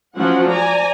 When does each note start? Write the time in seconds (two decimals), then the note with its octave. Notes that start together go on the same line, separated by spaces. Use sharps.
0.15 F3 F#3 C#4 F#5
0.50 D5 G#5 A#5